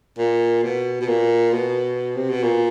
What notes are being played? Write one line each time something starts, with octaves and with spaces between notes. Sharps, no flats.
A#2
B2
B2
A#2
B2
C3
B2
A#2